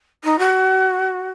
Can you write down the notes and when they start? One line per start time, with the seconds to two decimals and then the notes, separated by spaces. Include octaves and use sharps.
0.24 D#4
0.39 F#4